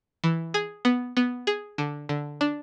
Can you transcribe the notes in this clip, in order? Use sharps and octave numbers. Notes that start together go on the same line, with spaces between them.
E3
G#4
B3
B3
G#4
D3
D3
D4